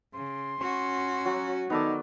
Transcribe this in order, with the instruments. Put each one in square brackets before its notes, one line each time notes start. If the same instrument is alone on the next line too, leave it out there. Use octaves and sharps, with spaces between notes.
[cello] C#3 [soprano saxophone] C6
[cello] C#4 F#4 [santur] C#6
[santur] F#3
[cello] D#3 [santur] B3 A4 D5 [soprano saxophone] D#4